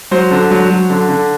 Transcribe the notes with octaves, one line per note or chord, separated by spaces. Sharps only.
F#3 C5
D3
F#3
F#3
D3
D3